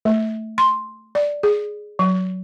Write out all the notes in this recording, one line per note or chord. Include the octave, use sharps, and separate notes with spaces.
A3
C6
D5
G#4
F#3